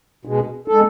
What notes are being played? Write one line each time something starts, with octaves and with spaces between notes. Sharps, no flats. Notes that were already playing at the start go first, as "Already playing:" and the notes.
B2 G#3
G#3 A4